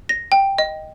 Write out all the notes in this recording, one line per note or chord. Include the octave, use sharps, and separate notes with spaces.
A#6
G5
D#5